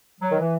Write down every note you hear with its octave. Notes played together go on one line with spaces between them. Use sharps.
F#3
D#3
E3